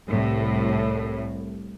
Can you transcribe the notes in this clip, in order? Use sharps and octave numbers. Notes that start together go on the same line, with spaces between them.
C2 A2